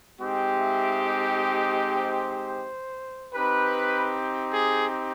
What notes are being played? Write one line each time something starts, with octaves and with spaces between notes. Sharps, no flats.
G#3 C4 D#4 G4
E5
D#5
D#5
C5
C4 D#4 G4 B4
G#4